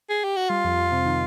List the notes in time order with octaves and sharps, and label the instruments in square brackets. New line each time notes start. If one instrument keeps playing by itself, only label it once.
[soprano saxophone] G#4
G4
F#4
[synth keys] G3 [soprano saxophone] F4
[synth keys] F2
F2
C3
D#3